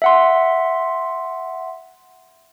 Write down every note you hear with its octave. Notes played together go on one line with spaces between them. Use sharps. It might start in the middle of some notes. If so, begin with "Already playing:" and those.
E5 F#5 C6